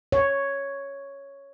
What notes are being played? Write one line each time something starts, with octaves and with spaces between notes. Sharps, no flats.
C#5